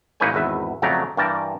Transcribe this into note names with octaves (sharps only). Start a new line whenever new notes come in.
A1 A#3 D#4 B4 C#5 G#5
G#1 E2 B4 E5
F2 C#3 F#3 A3 D5 A#5
G2 E3 G3 A#4 D5 A5